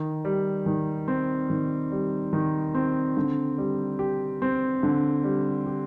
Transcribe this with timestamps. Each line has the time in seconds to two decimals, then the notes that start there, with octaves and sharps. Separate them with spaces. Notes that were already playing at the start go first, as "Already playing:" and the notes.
Already playing: D#3
0.25 G3
0.66 D#3
1.08 C4
1.50 D#3
1.92 G3
2.33 D#3
2.75 C4
3.17 D3
3.58 G3
3.99 G4
4.42 C4
4.83 D3
5.24 G3
5.66 G4